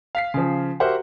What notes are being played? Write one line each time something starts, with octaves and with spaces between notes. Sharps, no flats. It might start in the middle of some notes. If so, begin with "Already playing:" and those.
F5 B6 C7
C#3 F3
F#4 G4 A#4 C5 E5 F#5